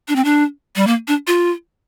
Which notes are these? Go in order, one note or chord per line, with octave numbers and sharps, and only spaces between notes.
D4
C4
D4
G3
A#3
D4
F4